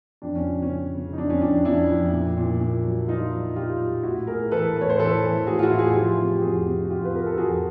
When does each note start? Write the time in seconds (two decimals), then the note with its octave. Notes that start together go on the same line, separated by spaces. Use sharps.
0.22 F2 D4
0.35 C#4
0.45 C#3
0.62 C#4
0.70 C#3
0.94 C#3
1.13 D#4
1.18 F2 D4
1.30 C#4
1.41 F2 D4
1.65 F2 D4 E4
1.90 F2
2.13 A#2
2.37 A#2
2.61 A#2
2.85 F#3
3.08 F#3 D#4 F4
3.32 F#3
3.56 A#2 F4 G4
3.80 F#3
4.03 A2 E4 F#4
4.27 A2 G#4 A#4
4.51 E3 A4 B4
4.76 A2
4.81 C#5
4.90 C5
4.99 E3 A4 B4
5.24 E3
5.47 A2 F#4 G#4
5.59 F4
5.63 E4 F#4
5.71 A2
5.78 F#4 G#4
5.94 F3 F4 G4
6.18 C3
6.36 G4
6.42 F2 F#4 G#4
6.66 C3
6.85 F#4
6.90 F2 F4 G4
7.05 B4
7.13 C3 A#4
7.26 A4
7.38 F2 F#4 G#4